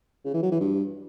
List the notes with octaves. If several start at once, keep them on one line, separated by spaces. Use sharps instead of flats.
C#3
E3
F#3
E3
G2